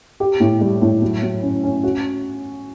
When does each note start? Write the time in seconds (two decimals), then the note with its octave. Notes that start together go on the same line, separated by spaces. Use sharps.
0.20 G4
0.40 A2
0.61 G3
0.82 A2
1.02 F#3
1.22 F#3
1.42 C#4
1.64 C#4
1.83 F#4